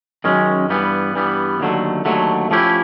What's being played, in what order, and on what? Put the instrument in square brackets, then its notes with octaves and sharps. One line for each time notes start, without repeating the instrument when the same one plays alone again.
[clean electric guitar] F#2 D#3 G#3 C#4
G2 E3 G3 B3
G2 E3 G3 B3
D#2 D3 F#3 A3
D#2 D3 F#3 A3
F3 A3 C#4 E4 G4